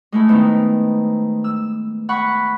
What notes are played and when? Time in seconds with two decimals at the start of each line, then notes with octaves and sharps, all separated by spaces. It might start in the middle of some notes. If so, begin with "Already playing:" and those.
0.12 G#3 A3 E4
0.28 D#3 B3 C4 D#4
1.44 E6
2.09 F#5 B5 C#6